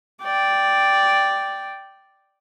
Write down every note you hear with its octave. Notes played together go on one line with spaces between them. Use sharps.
D5 G5